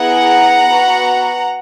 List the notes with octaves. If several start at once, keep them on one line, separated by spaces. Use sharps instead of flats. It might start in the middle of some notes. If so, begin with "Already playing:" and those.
Already playing: B3 E4 G#4 F#5 A#5
B3 F#4